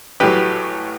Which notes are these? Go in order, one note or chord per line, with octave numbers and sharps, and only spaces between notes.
A1 A2 F#3 G4 B4